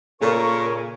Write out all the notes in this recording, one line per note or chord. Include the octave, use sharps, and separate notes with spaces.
A#2 C#3 A4 A#4 D5 C#6